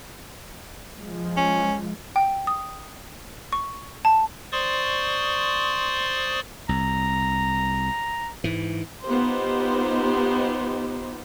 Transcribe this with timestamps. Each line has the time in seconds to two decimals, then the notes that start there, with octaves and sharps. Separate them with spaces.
0.99 F3 G#3
1.37 C#4
2.16 G5
2.47 D#6
3.52 C#6
4.05 A5
4.52 C5 D5 C6 C#6 D#6
6.69 C2 A#5
8.44 G#2 E3
9.07 B3 D#4 F4 G4 C5